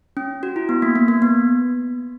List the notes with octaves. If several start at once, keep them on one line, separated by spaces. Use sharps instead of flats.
C#4
F#4
E4
B3
A#3
A#3
A#3
B3